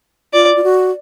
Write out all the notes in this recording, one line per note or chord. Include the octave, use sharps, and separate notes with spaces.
F4 D5
F4
F#4